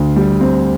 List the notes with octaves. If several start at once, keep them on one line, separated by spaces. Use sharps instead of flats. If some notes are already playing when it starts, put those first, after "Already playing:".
Already playing: D2 D3
G3
C4